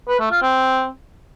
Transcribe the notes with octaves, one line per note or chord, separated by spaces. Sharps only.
B4
A3
F4
C4